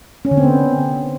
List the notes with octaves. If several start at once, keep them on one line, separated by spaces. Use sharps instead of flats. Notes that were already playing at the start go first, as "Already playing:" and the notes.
C#4
D3
C4
B3